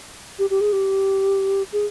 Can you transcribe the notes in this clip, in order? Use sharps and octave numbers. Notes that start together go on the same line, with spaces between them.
G4
G4
G#4
G4
G#4